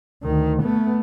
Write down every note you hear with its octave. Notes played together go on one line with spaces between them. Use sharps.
D2 D#3
A3 B3